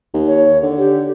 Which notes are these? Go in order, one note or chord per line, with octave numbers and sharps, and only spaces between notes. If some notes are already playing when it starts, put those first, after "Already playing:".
D#2
C#5
D3
G4